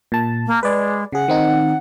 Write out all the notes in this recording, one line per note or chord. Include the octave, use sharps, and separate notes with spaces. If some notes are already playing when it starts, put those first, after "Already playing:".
A#2 A5
A#3
G#3 B4 D5
C#3 G#4 F#5
D#3 C4 D#4